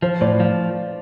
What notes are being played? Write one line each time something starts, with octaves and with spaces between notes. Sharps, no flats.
F3 C5
A2 D5
F3 F5